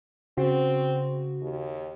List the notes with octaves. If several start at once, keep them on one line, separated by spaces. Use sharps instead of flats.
C#3 C4 F#4
D#2